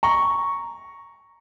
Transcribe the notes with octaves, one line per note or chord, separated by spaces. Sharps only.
A#5 C#6